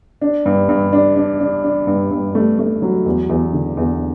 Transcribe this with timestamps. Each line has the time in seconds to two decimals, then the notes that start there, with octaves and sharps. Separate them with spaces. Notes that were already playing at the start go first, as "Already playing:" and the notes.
0.21 D4
0.46 G2
0.69 G2
0.93 D4
1.16 D4
1.40 D4
1.64 D4
1.87 G2
2.11 G2
2.35 A3
2.59 A3
2.82 F#3
3.06 E2
3.29 E2
3.53 D3
3.77 E2